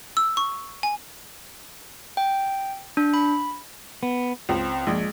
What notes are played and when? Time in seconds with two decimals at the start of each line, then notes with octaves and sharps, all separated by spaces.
0.17 E6
0.37 C#6
0.83 G#5
2.17 G5
2.97 D4
3.14 B5
4.03 B3
4.49 C#2 C4
4.87 A#1 G#3